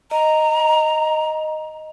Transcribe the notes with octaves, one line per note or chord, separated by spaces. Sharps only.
D#5 A#5